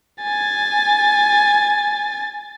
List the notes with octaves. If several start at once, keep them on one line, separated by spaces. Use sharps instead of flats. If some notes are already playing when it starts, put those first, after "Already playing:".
G#5 A6